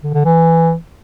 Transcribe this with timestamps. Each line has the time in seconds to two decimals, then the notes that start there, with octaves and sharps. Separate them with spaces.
0.03 D3
0.14 D3
0.25 E3